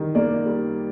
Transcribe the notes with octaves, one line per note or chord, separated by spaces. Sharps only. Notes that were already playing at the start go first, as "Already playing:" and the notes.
Already playing: D#3 G3
A#3 D5
G3